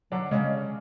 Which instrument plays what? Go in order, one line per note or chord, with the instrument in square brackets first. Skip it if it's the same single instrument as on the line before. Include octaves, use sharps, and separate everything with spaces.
[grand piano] D3 D4 [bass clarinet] F#3
[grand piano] C#3 C#4 [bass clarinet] G#3